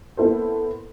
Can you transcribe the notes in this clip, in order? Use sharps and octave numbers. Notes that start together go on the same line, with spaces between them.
A#3 B3 E4 A4 C5